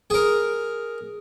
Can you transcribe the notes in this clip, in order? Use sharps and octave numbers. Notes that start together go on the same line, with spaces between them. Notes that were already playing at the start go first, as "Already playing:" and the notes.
G#4 A#4